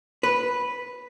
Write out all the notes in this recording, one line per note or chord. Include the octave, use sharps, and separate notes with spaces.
B4